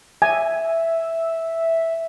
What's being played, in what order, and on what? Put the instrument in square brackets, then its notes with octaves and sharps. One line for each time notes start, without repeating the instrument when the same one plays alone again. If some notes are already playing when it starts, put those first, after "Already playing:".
[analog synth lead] E5 [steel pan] G#5